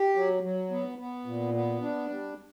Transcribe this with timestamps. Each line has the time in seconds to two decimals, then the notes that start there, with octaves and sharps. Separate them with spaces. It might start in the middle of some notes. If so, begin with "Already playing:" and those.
Already playing: G4
0.15 F#3
0.43 F#3
0.71 B3
0.98 B3
1.26 A#2
1.54 B3
1.82 D4
2.09 G3